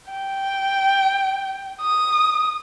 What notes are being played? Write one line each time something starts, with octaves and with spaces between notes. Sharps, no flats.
G5
D#6